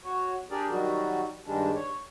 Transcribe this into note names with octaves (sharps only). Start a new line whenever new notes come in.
F#4 C#5
D4 G4 G#4 A#4 D5
D#3 F#3 G3 F#4
G2 D#3 G3 G#3 D4
C#5